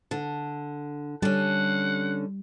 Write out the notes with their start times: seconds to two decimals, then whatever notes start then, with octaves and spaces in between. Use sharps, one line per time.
0.11 D3
1.22 D3 G3 C#4 F#5